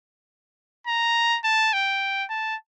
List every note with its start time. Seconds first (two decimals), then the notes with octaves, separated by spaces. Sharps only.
0.87 A#5
1.44 A5
1.73 G5
2.30 A5